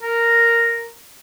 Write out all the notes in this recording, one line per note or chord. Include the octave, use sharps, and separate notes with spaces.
A#4